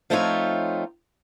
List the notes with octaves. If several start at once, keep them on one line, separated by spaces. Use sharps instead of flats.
F3 A3 C4 D#4 F4 C#5